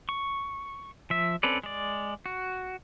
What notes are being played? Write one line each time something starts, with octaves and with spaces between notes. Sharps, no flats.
C#6
F3 E5
C4 C#4 A4 B4 D5
G#3 D5
F#4